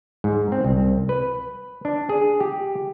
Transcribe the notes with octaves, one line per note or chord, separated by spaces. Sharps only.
G#2
C4
C2
B4
D4
G#4
G4